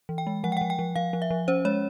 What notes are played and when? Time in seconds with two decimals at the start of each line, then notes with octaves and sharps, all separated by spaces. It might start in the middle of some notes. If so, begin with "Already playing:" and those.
0.09 E3
0.18 G5
0.27 G#3
0.44 F3 F#5
0.52 G5
0.57 F#5
0.61 F3
0.70 G5
0.79 F3
0.96 F3 F5
1.13 F3
1.22 E5
1.31 F3
1.48 C#4 C5
1.65 G#3 C#5